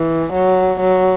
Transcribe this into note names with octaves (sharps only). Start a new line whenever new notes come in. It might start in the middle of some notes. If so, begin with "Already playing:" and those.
Already playing: E3
F#3
F#3